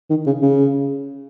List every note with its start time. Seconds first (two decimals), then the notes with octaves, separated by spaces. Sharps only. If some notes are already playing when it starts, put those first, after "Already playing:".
0.10 D#3
0.26 C#3
0.42 C#3